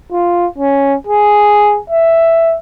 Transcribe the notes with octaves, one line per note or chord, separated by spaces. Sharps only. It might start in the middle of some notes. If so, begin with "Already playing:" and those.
F4
C#4
G#4
E5